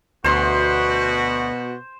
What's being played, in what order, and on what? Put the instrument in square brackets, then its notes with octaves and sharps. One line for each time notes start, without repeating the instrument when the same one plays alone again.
[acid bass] D2 [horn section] B2 F#4 [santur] C5 C6